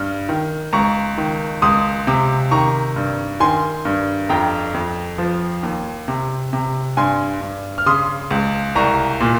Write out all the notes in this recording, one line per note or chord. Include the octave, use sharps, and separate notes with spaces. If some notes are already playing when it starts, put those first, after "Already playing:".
Already playing: G2 F6
D#3
C#2 A#5 C#6
D#3
C#2 C6 D#6
C3
D#3 A#5 C#6
G2
D#3 G#5 C6
G2
F2 G5 A#5
F2
F3
D#2
C3
C3
G2 G#5 C6
G2
F6
C#3 C6 D#6
C#2
C2 A#5 C#6
A#2